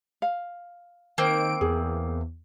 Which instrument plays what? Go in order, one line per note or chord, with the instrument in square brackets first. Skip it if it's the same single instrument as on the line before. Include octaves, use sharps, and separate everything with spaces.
[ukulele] F5
[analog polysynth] D#3 D7 [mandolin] A#3 C4
[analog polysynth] E2 [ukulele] G#4